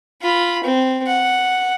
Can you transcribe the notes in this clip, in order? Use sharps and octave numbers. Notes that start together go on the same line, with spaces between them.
F4 B5
C4
F#5